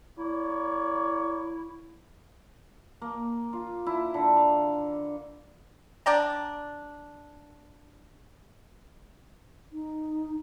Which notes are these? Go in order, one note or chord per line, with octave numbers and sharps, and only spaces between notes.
A#3 E4 C#5 D5
A#3
F4
E4
D3
F5
D4 D5 G5 A#5
D#4